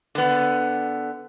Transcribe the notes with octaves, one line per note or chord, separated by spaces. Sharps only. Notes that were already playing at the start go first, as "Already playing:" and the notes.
D3 B3